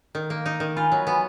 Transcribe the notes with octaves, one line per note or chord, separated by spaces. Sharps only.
D#3
A#3
D#4
D#3
F4 G#5 B5
F#3
B3